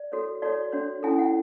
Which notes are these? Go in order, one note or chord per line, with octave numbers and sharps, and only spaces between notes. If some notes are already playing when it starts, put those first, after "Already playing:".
Already playing: D5
F#4 A4 C#5
F#4 A4 C#5 D5
D4 F#4 A4 C#5
C#4 E4 A4 G#5
F#5